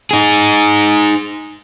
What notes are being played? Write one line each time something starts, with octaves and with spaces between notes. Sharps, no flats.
D#4 G#4